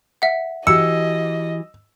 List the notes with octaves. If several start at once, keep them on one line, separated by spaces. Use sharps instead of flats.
E5 F#5
E3 F#4 G4 D#5 E6 C#7